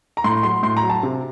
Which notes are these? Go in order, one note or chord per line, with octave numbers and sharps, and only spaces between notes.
A#5
A2 C6
F#3 C6
A2 C6
A#5
F#3
A5
C3